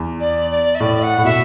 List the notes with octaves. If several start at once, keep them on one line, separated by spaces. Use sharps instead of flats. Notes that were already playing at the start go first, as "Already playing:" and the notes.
Already playing: E2
D5
D5
E5
A2 D5
F#5
A2
B2 E5